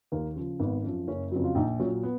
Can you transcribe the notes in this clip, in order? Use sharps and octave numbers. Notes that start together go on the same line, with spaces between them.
D#2 A#3
C#3 F3
G#1 B3
F#2 F3
F#1 C#4
F2 C#3 F#3
F4
A#1 D#4
A#2 F#3 C#4
B3